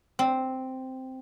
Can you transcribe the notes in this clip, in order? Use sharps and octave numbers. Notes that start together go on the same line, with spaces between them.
C4